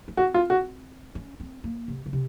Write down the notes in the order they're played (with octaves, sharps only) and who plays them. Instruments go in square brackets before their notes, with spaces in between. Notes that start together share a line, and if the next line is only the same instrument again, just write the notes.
[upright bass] C#4
[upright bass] C4 [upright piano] F#4
[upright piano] F4
F#4
[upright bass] C#4
C4
A#3
C3
C#3
C3